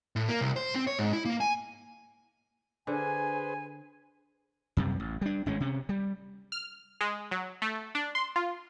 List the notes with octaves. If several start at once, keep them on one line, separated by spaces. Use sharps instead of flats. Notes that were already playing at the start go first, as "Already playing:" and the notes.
A2
A#3
C2
C5
C4
C#5
G#2
E4
A#3
G#5
D3 G#4 B4 C5 G#5
F#2 C3 G3
A1
G3 D4
G#1 A2 G#3 C#4
C3 C#4
G3
F6
G#3
F#3
A3
D4
C6
F4